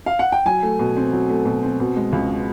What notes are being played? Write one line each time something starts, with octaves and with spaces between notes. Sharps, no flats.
F5
F#5
G5
F#3 G#5
A3
B2
C4
F#3
A3
B2
C4
B2
G#3
C#2